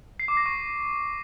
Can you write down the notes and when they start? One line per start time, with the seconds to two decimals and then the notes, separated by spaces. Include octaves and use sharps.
0.20 C7
0.28 D6
0.37 A#6
0.46 C#6